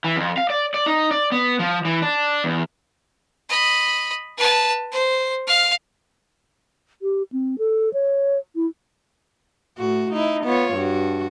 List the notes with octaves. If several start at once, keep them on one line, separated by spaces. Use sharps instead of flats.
E3
F2
F5
D5
D5
D#4
D5
B3
F3
E3
D4
E2
D#5 B5
B4 A5
C5
F5 F6
G4
C4
A4
C#5
E4
A2 F#4
D#4 E4
B3 F4 C#5
G2 F#4